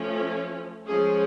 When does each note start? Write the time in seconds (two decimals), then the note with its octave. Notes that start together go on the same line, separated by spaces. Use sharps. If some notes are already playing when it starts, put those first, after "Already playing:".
Already playing: F3 A3 C#4
0.86 F3 G#3 C#4 G#4